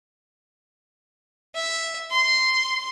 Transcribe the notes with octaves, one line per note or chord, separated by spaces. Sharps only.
E5
C6